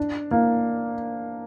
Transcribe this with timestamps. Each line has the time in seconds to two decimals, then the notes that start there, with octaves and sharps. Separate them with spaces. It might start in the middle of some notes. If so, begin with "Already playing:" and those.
Already playing: D4
0.31 A#3